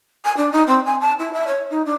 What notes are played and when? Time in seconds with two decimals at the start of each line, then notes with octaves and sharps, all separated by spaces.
0.24 G#5
0.36 D4
0.52 D#4
0.67 C4
0.85 G#5
1.00 A5
1.19 E4
1.32 E5
1.46 C#5
1.70 D#4
1.85 D4